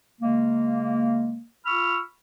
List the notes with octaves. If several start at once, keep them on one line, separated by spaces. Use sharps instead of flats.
C#3 G#3 A#3
F4 B5 C#6 E6 F6